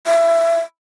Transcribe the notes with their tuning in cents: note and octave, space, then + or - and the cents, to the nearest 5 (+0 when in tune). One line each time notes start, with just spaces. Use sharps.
E5 +20